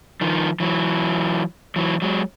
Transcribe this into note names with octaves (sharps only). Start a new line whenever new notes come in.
D#3 F3
E3 F#3
E3 F#3
F#3 G#3